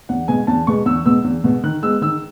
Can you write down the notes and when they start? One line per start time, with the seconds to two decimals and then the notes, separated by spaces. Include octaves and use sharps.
0.09 E2 F#5
0.28 B2 G#3 B3 G#5
0.47 E2 A5
0.67 B2 G#3 B3 C#6
0.86 E2 E6
1.06 B2 G#3 B3 E6
1.24 E2
1.44 B2 G#3 B3
1.63 D#3 F#6
1.83 G#3 B3 E6
2.01 D#3 E6